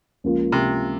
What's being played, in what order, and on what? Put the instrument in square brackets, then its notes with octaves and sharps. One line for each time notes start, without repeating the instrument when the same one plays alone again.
[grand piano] C#2 C#3 F3 A#3 F4
[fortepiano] C3